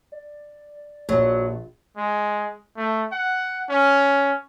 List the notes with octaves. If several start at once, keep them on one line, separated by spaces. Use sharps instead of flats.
D5
A#1 F#3
G#3
A3
F#5
C#4